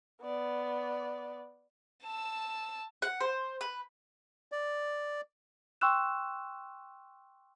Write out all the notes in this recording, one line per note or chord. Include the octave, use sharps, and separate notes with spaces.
B3 D5
A5 E6
F#5
C5
B4
D5
G5 C6 C#6 E6 F#6 E7